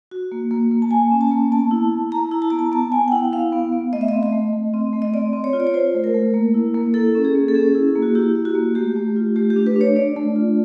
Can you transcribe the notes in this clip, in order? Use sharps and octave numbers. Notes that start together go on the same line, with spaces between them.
F#4
A#3
A#3
A#3
A5
A#3 G#5
C#4
A5
A#3
B3 A5
E4
E4
E4 A#5
E4
A5
B3 A#5
A5
B3 A5
B3 G#5
G5
E4 F#5
E4 F5
B3
B3
A3 D#5
E5
C4 D#5
D#5
A3
A3
C4
A3
D#5
C4 D5
C4
C#5
F4
D5
C#5
F4 C5
A3
A#4
A3
A#3
E4
A#3
E4 A4
C#4
G#4
A#3
A4
C#4 G#4
E4
A#3
F#4
E4 G4
E4
F#4
A#3
A3 G4
A3
F4
A3 G4
G4
D4
B4
D4
C#5
D4 D5
A3
F4